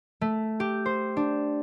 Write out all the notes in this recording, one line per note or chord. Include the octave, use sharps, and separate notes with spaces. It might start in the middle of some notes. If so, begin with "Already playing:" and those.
A3
G4
C5
D4